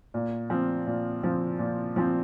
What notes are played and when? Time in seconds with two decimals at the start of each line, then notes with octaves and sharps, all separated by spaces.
0.14 A#2
0.50 F3 C4
0.87 A#2
1.24 F3 C4
1.59 A#2
1.96 F3 C4